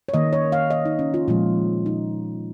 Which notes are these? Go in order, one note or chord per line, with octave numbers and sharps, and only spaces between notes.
C#5
D#3 A#3 D#5
C#5
F5
D#5
D#4
C#4
F4
A#2 F3 G#3 F4
D#4